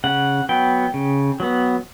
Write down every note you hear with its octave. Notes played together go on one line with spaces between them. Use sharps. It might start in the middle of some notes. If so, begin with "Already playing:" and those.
C#3 F#5
F#3 B3 G5
C#3
F#3 B3